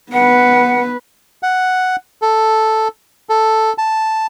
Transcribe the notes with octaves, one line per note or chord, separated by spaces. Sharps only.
B3 B4 F#5
F#5
A4
A4
A5